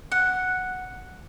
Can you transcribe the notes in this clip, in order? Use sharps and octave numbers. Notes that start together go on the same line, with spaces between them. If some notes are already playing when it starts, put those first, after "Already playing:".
F#5